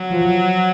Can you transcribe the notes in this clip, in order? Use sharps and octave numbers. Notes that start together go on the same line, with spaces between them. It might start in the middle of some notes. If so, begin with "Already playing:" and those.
Already playing: F#3
F3